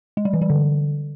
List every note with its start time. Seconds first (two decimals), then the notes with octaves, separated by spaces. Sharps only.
0.17 G#3
0.25 G3
0.33 E3
0.42 G3
0.50 D3